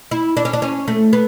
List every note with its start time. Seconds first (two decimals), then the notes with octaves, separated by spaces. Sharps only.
0.11 E4
0.37 D4
0.45 C#4
0.53 D4
0.62 C#4
0.88 A3
1.13 B3